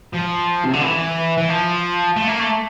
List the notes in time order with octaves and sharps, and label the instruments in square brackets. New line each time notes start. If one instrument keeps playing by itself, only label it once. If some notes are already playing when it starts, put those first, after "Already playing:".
[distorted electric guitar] F3
C3
D3
E3
E3
F3
A3
A#3
A3